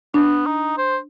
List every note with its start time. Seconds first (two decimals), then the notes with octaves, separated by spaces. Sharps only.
0.14 B3 D4
0.46 D#4
0.78 C5